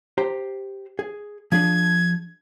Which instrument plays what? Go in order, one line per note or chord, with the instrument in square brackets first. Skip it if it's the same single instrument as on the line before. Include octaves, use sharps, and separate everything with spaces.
[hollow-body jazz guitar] G4 C5 A#5
G#4
[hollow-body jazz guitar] F3 D4 G#4 [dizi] G#6